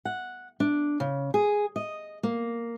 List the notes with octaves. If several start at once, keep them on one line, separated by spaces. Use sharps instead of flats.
F#5
D4
C#3
G#4
D#5
A#3